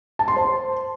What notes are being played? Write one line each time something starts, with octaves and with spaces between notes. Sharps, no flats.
A5
C6
C5